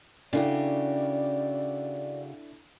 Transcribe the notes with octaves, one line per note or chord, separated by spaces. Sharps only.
C#3 D4 E4 F#4 G4 A4 D5